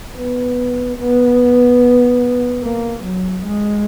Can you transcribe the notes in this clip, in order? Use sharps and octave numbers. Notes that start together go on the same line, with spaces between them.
B3
B3
A#3
F#3
G#3